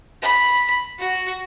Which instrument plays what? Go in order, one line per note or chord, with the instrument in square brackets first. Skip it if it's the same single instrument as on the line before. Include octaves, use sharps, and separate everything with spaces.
[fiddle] B5
F#4